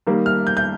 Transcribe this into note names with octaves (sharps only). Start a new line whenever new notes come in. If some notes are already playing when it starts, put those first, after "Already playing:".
D#3 G3 A#3
F6
G6
G6